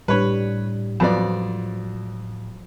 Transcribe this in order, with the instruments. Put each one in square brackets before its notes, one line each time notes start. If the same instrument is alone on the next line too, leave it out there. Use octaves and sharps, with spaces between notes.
[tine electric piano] A2 [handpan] G3 D4 [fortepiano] B4 C#5
[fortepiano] F2 B3 D5 [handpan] F3 F#3